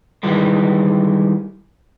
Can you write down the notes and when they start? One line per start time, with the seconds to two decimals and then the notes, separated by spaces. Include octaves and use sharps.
0.23 D#3 E3 G3 G#3